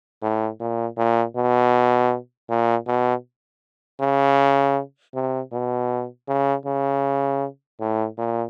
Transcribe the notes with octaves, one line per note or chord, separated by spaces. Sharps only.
A2
A#2
A#2
B2
A#2
B2
C#3
C3
B2
C#3
C#3
A2
A#2